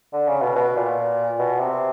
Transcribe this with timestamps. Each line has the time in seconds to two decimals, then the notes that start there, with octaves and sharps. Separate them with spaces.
0.13 D3
0.28 C#3
0.42 B2
0.55 B2
0.76 A#2
1.39 B2
1.60 C3